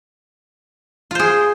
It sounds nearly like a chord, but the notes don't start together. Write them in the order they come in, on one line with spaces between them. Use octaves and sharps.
F4 C5 G#4